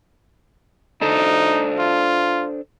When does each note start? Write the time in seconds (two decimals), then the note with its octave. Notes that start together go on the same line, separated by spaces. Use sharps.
1.01 D4 D#4 A4 C5
1.79 F4